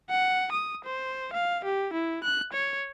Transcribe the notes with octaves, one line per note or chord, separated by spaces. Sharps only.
F#5
D#6
C5
F5
G4
E4
F#6
C#5